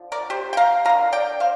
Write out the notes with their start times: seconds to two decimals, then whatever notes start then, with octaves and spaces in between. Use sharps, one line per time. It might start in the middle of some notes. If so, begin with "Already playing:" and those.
Already playing: D3 F3
0.12 A#4 D5
0.30 G4 C5
0.53 G5
0.57 F5 A#5
0.85 D3 F5 A#5
0.89 A#3
1.12 D5 G5
1.40 C5 F5